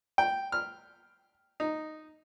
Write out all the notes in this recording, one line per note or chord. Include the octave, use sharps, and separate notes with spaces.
G5
F6
D#4